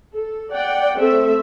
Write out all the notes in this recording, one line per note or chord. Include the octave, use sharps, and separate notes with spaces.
A4
D5 F#5 G5
A3 C4 A4 E5